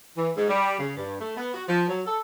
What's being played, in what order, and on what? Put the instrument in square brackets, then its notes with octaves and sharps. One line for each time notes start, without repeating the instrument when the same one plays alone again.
[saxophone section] E3
G#2
G3
C#3
G2
A3
B3
F#4
F3
F#3
A4